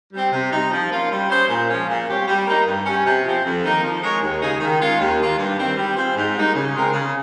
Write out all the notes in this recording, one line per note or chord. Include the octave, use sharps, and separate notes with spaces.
G3 C4
C3
G3 C4 D#4
F3
A#3 C#4 F4
G3
C#4 G#4 C5
A#2
F3 G#3 C#4
A#2
G3 C4 G4 C#5
G3
A#3 D#4
G2
G3 C#4
C3
F3 C4
F2
D#3 A#3 D#4 A#4
F3
G#3 D#4 A#4 C#5
D#2
C#3 G#3 D#4 G#4
D#3
G#3 C#4 F4
D#2
D#3 A#3 F4
G2
D#3 G3 C4
G3
C4 F4 G#4 C5
G#2
G3 A#3 D#4
C#3
G#3 C4 F4 A#4
C#3